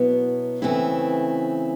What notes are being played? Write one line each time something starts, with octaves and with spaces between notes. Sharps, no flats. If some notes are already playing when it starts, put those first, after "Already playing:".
Already playing: B2 F#3 B3 E4
C#3 E3 A3 C4 E4